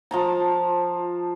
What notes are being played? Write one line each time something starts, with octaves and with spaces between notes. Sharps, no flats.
F3 A5 A#5